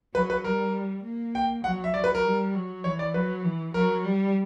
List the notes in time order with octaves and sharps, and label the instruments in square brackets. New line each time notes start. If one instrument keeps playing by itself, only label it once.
[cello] F#3 [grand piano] B4
[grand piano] B4
[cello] G3 [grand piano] A#4
[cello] A#3
[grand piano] G5
[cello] F#3 [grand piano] F#5
[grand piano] E5
[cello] F#3 [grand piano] D5
[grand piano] B4
A#4
[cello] G3
F#3
[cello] E3 [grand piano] C#5
[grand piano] D5
[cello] F#3 [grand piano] B4
[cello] E3
[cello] F#3 [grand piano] A#4
[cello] G3